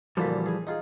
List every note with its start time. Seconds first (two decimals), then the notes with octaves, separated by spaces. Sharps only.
0.17 D2 A#2 E3 F3 G3 B4
0.46 G#4 G#5
0.67 D#4 F4 G#4